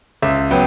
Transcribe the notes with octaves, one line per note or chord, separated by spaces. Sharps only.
C#2 E5
F#3 B3 G5